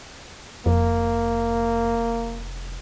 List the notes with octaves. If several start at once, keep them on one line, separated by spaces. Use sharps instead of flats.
F1 F2 A#3